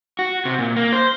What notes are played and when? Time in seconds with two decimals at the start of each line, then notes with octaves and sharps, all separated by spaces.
0.19 F#4
0.45 C3
0.59 A#2
0.77 A#3
0.93 C5